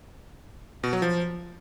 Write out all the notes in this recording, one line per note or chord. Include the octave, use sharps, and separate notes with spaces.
B2
F#3
F3